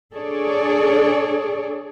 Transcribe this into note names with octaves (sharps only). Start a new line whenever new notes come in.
D4 G#4 A4 C#5 D5